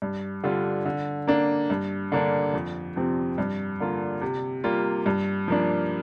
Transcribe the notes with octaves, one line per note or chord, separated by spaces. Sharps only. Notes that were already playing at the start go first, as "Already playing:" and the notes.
G2
D3 G3 D4 F4
D3
A#3 D4
G2
D3 A#3 D4
F2
C3 F3 C4
G2
D3 A#3 F4
C3
G3 A#3 F4
G2
F3 A#3 D4